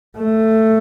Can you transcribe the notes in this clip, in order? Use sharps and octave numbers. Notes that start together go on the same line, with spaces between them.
A3